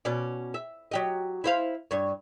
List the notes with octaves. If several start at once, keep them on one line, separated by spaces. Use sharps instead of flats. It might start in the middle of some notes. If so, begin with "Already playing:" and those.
B2 C#4 D5
E5
F#3 G4 D#5
E4 C5 F5
G2 C#5